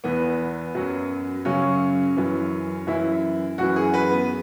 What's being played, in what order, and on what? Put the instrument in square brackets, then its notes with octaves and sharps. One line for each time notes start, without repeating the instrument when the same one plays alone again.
[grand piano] E2 E3 B3
F#2 F#3
F#2 C#3 F#3 C#4
F#2 E3
F#2 E3 E4
F#2 E3 F#4
G#4
B4
B3